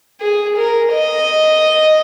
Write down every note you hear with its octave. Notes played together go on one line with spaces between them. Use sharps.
G#4
A#4
D#5